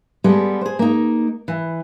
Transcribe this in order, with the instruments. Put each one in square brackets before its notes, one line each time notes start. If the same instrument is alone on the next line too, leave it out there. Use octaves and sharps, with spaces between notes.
[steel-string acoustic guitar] G3 G#3 B3 A4
G#4 C5
A#3 D#4
E3